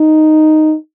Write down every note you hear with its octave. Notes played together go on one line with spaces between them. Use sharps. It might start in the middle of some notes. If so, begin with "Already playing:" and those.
Already playing: D#4